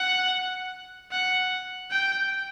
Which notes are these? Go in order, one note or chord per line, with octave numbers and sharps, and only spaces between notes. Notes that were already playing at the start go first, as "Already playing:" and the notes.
Already playing: F#5
F#5
G5